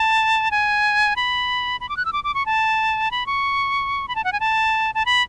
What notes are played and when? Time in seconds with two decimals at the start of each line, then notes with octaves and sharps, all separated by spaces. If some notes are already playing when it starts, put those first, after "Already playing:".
Already playing: A5
0.51 G#5
1.16 B5
1.80 B5
1.89 D6
1.97 F#6
2.05 E6
2.13 D6
2.24 D6
2.34 C#6
2.46 A5
3.11 B5
3.26 C#6
4.08 B5
4.15 A5
4.24 F#5
4.32 G#5
4.40 A5
4.95 A5
5.05 B5